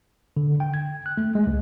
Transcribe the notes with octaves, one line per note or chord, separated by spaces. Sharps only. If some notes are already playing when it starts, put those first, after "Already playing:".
D3
G5
G#6
F#6
A3
G#3
C#2